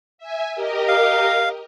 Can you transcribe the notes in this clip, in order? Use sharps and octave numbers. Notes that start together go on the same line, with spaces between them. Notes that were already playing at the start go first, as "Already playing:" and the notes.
E5 G#5
G4 A#4 D#5
F5